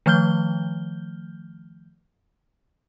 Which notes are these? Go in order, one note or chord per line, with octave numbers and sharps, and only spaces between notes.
D#3 F3 A3 F6 G6 G7